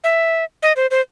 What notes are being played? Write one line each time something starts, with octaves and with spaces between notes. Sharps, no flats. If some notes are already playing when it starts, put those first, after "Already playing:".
E5
D#5
C5
C5